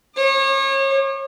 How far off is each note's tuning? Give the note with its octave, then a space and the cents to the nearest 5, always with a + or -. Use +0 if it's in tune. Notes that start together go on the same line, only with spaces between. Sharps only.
C#5 -30 D6 +40